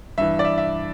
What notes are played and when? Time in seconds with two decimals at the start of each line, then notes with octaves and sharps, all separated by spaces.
0.18 G2 E3 E5
0.39 D5
0.45 E5
0.58 E5